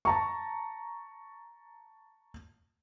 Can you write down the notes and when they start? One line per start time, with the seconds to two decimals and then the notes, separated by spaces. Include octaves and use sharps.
0.05 A5 A#5 C#6